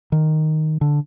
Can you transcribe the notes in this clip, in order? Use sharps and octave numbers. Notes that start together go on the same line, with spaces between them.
D#3
D3